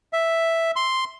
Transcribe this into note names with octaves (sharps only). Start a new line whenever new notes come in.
E5
C6